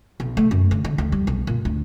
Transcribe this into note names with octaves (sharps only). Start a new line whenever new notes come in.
B1
A3
F#2
D3
D3
D2
G3
B1
A#2
D2